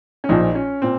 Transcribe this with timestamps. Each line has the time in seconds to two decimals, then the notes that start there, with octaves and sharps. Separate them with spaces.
0.24 C#4
0.29 A#1 A#2 F3 D#4
0.55 C#4
0.82 A#2 C4